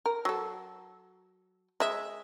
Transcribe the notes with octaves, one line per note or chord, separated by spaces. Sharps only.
A#4
F#3 A4
G#3 E5